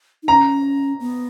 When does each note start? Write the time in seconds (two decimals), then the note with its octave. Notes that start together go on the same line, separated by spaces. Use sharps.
0.23 D#4
0.28 C#4 A#5
1.00 B3